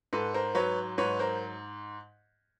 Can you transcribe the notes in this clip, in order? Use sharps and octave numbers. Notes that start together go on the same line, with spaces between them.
G#2 A4 B4
A#4 C5
F#3 B4 C#5
G#2 B4 C#5
A#4 C5